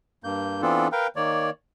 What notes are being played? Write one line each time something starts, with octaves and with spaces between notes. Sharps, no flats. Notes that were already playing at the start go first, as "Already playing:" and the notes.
G2 A#3 G6
E3 B3 C4 D4 F4 A4
A#4 B4 F5 G5
D#3 A#3 C#5 D5